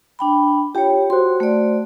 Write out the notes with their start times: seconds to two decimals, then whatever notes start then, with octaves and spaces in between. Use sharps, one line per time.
0.19 D4 G5 B5
0.75 F4 G4 C#5 G5
1.10 F#4 C5 C6
1.40 A3 D5